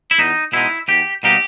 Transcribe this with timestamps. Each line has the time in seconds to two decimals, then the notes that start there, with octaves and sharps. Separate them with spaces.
0.11 E4
0.18 E2 D#4
0.53 B2 G#3 D#4 E4
0.88 E2 G4
1.23 B2 G3 A#3 D#4 G4